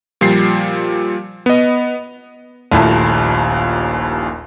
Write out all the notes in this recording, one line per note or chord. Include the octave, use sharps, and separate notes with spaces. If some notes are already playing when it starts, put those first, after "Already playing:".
A#2 F3 G3 C7
B3 D#5
D#1 A#1 D#2 A3 E4 A5